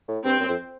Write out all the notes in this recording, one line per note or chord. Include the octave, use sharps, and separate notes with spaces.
A2
G2 C4
F#2
F2